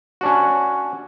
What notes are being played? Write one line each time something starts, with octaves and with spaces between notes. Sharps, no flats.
C#4 D4 F#4